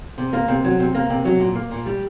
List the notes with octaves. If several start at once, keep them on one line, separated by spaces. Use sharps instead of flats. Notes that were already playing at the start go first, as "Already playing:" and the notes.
C3
A#3
C3
F#3
C3
A#3
C3
F#3
A#2
A#3
A#2
G3